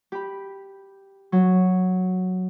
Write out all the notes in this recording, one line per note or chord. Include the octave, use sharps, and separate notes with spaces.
G4 B5
F#3